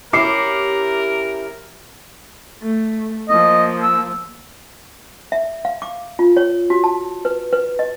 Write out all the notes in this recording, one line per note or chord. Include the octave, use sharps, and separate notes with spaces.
C#4 E4 G4 A#4 D6 C7 C#7
A3
F3 A#3 D#5
E6
E5
F5
D6
F4
C#5
F#4
A5
B4
B4
D#5